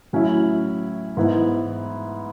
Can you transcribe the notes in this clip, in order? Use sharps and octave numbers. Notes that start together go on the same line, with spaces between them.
A2 F#3 C#4 E4
G#2 E3 B3 E4